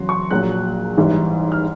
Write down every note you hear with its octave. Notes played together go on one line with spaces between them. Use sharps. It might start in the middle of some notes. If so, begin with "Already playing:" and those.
Already playing: E2 C#3 F#3 C6
C#6
A#1 A#2 F#3 F#6
A1 G#2 E3 G3
F6